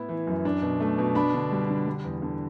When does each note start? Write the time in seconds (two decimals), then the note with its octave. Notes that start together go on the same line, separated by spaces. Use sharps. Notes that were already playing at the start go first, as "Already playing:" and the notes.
Already playing: A2 B3 E4
0.09 E3
0.27 F#2
0.45 D4
0.62 B2
0.80 A3
0.98 B2
1.15 D4 B5
1.34 D3
1.52 G3
1.69 D3
1.87 G3
2.05 E2
2.22 D3